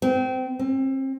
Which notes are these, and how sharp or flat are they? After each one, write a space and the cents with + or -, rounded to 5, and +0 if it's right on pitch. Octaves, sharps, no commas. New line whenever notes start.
C4 -25
C4 +35